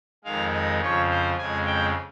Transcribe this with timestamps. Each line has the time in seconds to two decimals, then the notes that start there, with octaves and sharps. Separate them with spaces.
0.24 F2 D#3 G#3 F5
0.53 D#5
0.81 F2 C#3 F3 C#5
1.10 C5
1.38 F2 C#3 G#3 G#5
1.66 G5